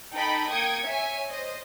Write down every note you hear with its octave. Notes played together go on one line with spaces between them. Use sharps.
D#4 A4 D#5 G5 B5
A#3 G5 D#6 G#6 C#7
C#5 E5 G#5
C5 D#5